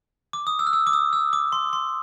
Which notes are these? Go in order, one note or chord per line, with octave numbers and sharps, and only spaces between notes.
D6
D#6
E6
F6
E6
D6
D#6
E6
D6
C6
C6